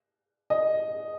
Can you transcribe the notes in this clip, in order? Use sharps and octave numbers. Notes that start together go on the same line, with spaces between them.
D#5